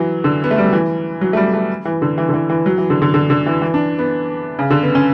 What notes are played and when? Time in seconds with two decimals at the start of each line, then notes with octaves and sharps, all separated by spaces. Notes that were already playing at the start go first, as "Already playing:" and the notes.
Already playing: E3 F#3
0.24 D3
0.44 B3
0.51 A3
0.58 G3
0.66 F#3
0.73 E3
1.21 F#3
1.33 A3
1.37 G3
1.53 A3
1.85 E3
2.02 D3
2.18 E3
2.29 D3
2.34 E3
2.50 E3
2.66 F#3
2.78 E3
2.90 D3
3.02 D3
3.14 D3
3.30 D3
3.46 E3
3.62 E3
3.74 D4
3.99 B3
4.59 C#3
4.70 D3
4.83 B3
4.95 C#4